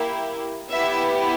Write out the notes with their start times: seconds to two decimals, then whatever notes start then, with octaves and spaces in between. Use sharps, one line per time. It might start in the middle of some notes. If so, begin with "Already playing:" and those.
Already playing: A#3 E4 G4
0.70 B3 E4 G4 E5